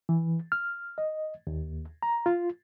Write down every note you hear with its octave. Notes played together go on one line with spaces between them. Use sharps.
E3
F6
D#5
D#2
A#5
F4